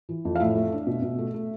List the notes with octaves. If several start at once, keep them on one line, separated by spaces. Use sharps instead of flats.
E3
F2
F5
A2 E5
A3
D4
B2
B2
A3
A3